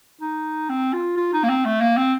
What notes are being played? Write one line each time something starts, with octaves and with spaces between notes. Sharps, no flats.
D#4
C4
F4
F4
D#4
A#3
C4
A3
A#3
C4